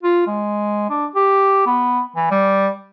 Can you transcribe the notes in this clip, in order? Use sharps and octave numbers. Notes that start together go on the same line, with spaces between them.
F4
G#3
D4
G4
B3
E3
G3